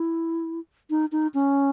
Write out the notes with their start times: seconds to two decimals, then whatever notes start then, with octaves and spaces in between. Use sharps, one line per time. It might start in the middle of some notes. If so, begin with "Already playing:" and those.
Already playing: E4
0.90 D#4
1.12 D#4
1.34 C#4